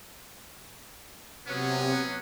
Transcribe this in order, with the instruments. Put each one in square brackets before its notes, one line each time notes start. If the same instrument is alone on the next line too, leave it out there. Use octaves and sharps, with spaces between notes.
[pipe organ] C3 [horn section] F#3 B3 [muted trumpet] C#4